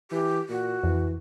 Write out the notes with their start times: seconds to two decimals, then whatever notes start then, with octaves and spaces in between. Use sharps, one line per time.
0.11 E3 G4
0.49 A#2 F#4
0.83 F2 E3